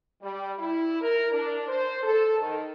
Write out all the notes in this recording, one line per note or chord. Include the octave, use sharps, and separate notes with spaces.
G3
E4
A#4
D4
C5
A4
D#3